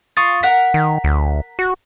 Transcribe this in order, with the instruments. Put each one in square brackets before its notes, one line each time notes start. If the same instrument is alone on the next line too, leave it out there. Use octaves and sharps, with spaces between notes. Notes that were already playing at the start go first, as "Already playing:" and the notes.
[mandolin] F4 [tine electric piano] C#6 D#6 A6
[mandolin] A#4 F#5 [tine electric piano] B6
[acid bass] D#3
D2
F#4